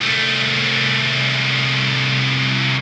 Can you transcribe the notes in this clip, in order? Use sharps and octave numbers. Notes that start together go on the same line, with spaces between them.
C2 A3